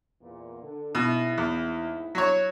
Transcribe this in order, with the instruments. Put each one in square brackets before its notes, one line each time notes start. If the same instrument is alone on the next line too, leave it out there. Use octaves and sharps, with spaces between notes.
[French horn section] E2 A#2
D3
[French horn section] D#2 G#2 E4 [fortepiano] B2
[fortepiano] E2
F#3 C#5